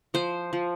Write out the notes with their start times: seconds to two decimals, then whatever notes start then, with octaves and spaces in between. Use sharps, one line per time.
0.14 F3 C5
0.53 F3